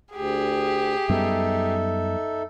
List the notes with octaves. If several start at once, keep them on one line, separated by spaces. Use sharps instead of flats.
D2 G4 G#4
F#2 G3 B3 D#4 A4 E5